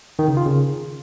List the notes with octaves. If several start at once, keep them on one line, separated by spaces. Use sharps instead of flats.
D#3
C#3
F4
C#3